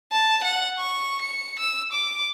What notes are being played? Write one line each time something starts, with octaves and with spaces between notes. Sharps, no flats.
A5
F#5
C#6
C#7
E6
D6